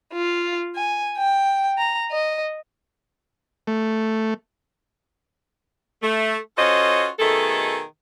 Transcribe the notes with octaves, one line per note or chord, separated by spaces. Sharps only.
F4
G#5
G5
A#5
D#5
A3
A3
C#4 F4 F#4 A4 C5 D#5
B2 D#3 A3 G#4 A4